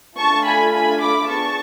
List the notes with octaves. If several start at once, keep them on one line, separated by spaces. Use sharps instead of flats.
A3 D4 F4 A4 A5 C#6
G#5 B5
G#5 B5
B5 D6
B3 D4 G#4 A5 C#6